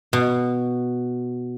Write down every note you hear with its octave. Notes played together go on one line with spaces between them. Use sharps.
B2